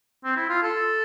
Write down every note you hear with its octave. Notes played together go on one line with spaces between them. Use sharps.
C4
E4
F4
A4